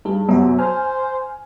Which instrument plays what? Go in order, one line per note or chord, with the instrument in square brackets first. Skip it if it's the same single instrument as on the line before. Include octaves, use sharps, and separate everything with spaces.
[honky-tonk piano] G2 [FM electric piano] D#4 G#4
[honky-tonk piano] F#2 [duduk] C3 [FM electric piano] B3 E5 F#5
[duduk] C5 [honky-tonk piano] G#5 [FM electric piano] F6